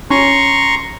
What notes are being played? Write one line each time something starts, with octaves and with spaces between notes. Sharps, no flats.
C#4 A#5 C6 C#6